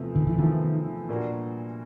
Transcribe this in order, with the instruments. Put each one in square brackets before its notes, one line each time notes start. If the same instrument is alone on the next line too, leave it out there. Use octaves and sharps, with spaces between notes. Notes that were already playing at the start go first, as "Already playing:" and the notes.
Already playing: [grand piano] E2 C3 F3 A3
[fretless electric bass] D#3
E3
[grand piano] E2 C3 F3 A3 [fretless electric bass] D#3
[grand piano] A#2 G3 A#3 D4 F#4